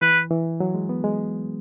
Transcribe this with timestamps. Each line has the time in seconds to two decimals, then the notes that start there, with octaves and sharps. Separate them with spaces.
0.02 E3 B4
0.31 E3
0.60 F#3
0.74 G#3
0.89 B3
1.04 G#3